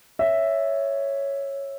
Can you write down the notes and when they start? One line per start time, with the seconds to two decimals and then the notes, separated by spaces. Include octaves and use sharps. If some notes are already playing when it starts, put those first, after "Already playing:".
0.19 C#5 E5